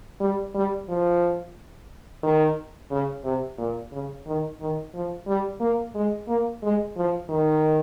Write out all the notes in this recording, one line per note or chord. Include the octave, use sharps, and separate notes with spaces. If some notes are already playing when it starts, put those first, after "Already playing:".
G3
G3
F3
D#3
C#3
C3
A#2
C#3
D#3
D#3
F3
G3
A#3
G#3
A#3
G#3
F3
D#3